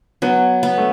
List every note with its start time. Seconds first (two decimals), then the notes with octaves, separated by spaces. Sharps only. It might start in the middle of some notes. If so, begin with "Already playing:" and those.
0.22 F#3 B3
0.63 B3
0.78 A3